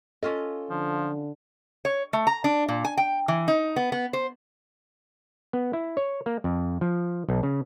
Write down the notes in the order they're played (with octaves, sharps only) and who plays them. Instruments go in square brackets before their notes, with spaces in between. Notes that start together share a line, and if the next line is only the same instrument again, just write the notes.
[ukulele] C#4 F4 D#5 [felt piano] A4
[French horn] D3 [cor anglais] F3
[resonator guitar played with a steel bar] C#5
A3
A#5
D4
A#2
G#5
G5
E3
D#4
B3
B3
C5
[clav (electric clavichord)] B3
E4
C#5
A#3
F2
F3
B1
C#3